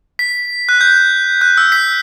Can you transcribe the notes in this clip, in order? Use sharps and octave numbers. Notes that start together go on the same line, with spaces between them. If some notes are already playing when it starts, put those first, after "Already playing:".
B6
F#6
G6
F#6
E6
B6